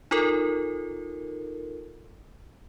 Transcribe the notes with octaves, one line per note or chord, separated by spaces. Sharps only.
D#4 F4 A4 A#4